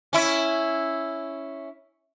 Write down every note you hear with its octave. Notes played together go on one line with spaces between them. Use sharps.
C#4 E4